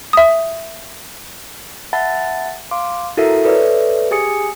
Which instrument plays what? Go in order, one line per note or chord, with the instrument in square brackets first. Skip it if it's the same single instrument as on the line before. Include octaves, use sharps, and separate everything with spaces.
[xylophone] E5 D#6
[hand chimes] E5 F#5 A5 B5 A6
F5 C6 D6
E4 F#4 A4 A#4 E5
A4 B4 C#5 D5 E5
G4 G#4 G#5 D#6 C#7